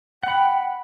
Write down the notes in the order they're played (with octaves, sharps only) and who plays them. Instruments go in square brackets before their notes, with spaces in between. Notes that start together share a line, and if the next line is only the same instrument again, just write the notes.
[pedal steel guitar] F#5 B5 [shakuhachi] G5